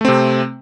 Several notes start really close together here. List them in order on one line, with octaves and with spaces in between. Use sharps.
A3 C4 C3